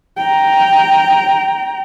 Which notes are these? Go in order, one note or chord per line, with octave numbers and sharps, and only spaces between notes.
G5 A#5